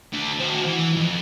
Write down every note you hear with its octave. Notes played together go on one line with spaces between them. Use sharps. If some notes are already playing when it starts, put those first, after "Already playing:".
D3 A3
C4 F#4
E3
F2